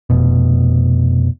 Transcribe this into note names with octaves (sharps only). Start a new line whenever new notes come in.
F1 B2